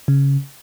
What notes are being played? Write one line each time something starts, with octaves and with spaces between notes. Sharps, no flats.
C#3